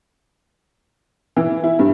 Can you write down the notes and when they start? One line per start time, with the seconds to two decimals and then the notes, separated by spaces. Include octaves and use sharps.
1.37 E3
1.64 E4
1.79 G2